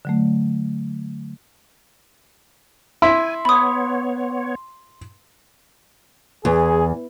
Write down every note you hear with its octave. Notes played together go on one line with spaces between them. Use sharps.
D3 F#3 A3
E4 G#5 C6
B3 C#5 B5 D#6
E2 G#4